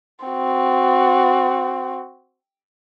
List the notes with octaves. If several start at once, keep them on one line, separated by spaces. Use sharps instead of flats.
C4 F#4